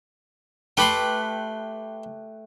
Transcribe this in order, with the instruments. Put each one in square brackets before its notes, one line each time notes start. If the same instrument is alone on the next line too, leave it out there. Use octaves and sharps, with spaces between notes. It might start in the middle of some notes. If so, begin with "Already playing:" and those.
[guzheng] A3 G4 B4 [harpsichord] G5 B5 C6